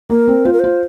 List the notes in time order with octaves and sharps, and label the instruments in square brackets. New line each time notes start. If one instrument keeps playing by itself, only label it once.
[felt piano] A#3 [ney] A#4
[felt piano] C4
[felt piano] F4 [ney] C5
[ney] A#4
[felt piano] F4 [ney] C5